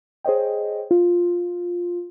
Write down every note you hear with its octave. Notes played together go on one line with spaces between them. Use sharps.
G#4 C5 C#5 D#5 G5
F4